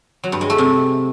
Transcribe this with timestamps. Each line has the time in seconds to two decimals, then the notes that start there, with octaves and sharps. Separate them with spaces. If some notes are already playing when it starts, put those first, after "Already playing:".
0.24 F#3
0.32 G2
0.41 G#3
0.50 A3
0.58 C3